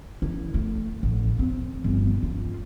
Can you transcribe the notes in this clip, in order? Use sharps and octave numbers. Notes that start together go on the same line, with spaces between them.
E4
A3
A1
C4
G1
F4